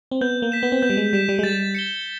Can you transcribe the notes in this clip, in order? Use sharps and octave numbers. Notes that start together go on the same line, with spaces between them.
C4
B3 G6
A#3
B6 E7
B3
C4
B3 G6
G3
G#3
G3 B6 E7
G3
G#3
G3 A6
C#7 E7 G7